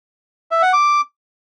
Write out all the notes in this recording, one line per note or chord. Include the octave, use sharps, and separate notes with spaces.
E5
F#5
D6